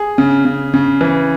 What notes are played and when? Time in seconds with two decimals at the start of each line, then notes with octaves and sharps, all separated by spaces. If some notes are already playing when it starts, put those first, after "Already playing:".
Already playing: G#4
0.18 C#3
0.45 C#3
0.74 C#3
1.01 E3